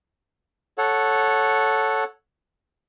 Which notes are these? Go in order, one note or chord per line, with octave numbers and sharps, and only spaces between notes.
A4 C#5 F#5